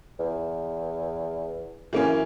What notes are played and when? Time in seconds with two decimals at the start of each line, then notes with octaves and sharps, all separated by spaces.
0.19 E2
1.93 F#2 E3 A#3 C#4